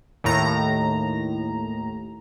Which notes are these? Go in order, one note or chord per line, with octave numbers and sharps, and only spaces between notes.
D#2 A2 A#5